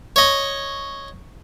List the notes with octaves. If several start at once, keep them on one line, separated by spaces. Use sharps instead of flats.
C#5 D#5